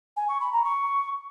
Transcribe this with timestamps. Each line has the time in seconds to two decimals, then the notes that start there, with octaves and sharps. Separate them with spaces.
0.17 G#5
0.29 C#6
0.40 B5
0.52 A#5
0.64 C#6